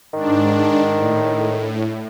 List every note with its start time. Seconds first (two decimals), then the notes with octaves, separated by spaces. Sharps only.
0.13 G#2 D#3 D4
0.97 A2